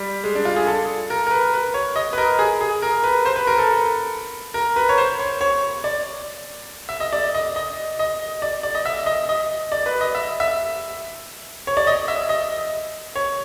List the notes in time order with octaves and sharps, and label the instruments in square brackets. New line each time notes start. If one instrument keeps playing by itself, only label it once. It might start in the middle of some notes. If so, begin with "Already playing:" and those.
Already playing: [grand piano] G3
G#3
D4
F4
G#4
A4
A#4
A#4
B4
B4
C#5
D#5
B4
A#4
G#4
G#4
A#4
B4
C5
B4
A#4
A4
A#4
B4
C#5
C5
C#5
C#5
D5
E5
D#5
D5
D#5
D#5
D#5
D5
D5
D#5
E5
D#5
D#5
D5
B4
D#5
E5
E5
C#5
D5
D#5
E5
D#5
C#5